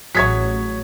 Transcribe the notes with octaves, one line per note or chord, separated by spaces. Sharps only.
A1 F#3 G#4 C#5 G#6 B6